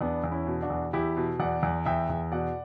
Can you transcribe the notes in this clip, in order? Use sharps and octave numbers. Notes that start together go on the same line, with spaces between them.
E2 B3 D4
E2
C#4 E4
B2
D4 F#4
E2
E2 E4 G4
B2
E2 D5 F#5
E2
E2 E5 G5
E2
B2 D5 F#5